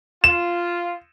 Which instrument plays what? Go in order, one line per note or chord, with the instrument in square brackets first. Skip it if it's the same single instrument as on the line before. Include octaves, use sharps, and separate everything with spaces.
[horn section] F4 [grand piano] E7